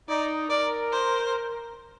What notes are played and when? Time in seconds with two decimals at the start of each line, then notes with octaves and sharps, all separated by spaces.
0.09 D#4 D5
0.50 A#4 D5
0.92 C5